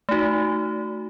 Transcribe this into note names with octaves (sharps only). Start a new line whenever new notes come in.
A3 D#4 F#4